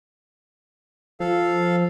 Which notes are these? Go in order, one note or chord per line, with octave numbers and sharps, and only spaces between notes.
F3 A4 F5